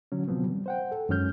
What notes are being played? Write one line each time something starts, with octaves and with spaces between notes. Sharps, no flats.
D3 F#3 C#4
C3 D#3 F3 F#3 B3 C4
G3
C5 F#5 G5
A4
F#2 D#3 G#3 C#4 F6 G6